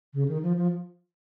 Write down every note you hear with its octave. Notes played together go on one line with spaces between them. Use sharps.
C#3
D#3
F3
F3